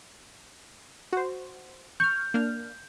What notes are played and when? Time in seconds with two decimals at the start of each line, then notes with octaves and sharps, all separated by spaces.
1.13 F#4 C5
2.00 C#6 F6 G6
2.34 A#3 D4 F6